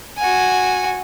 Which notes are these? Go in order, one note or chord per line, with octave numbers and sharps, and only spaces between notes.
F#4 G#5